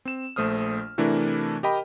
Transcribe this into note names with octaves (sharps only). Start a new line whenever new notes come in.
C4 E7
A#1 A3 C5 D#6 F6
C3 E3 A3 D4 E4 A#4
G4 A#4 D#5 G5 B5